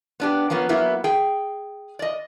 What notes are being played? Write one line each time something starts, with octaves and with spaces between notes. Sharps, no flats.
B3 D4 G4
F3 A#3 B3 C#4
F#3 A#3 B3 E4
G#4 G5
D5 D#5